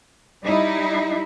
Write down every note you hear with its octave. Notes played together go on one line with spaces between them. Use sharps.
G3 D#4 E4